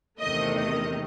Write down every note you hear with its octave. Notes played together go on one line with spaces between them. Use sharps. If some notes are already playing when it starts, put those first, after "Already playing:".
E2 C3 D#3 A3 D#5
D#5